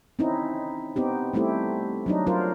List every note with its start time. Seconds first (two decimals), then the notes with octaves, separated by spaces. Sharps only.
0.19 C4 C#4 D#4 E4
0.96 B3 C4 D#4 G4
1.33 G3 A3 C4 E4 G4
2.06 F#3 D4 D#4
2.26 F#3 D#4 F4 A#4 C5